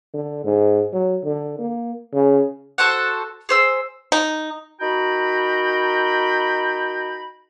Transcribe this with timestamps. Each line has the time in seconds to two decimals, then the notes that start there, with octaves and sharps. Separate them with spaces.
0.14 D3
0.45 G#2
0.93 F#3
1.24 D3
1.59 A#3
2.14 C#3
2.78 F#4 A4 C5 F#5
3.49 G#4 C5 E6
4.12 D#4
4.81 D#4 F#4 A#4 G5 A#5 B5